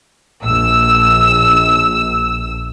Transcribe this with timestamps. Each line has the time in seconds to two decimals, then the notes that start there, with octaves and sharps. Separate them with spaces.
0.43 A#1 E6